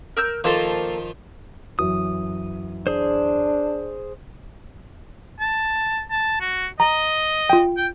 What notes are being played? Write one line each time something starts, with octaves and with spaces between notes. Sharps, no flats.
A#4 E6 G6
D#3 F3 A#3 F4 A4 C5
F#2 E3 F#3 D#6
D4 G#4 C5
A5
A5
F#4
D#5 A#5
F4 G5
G5